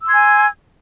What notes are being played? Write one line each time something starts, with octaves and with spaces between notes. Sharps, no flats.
G#5 C6 E6 G#6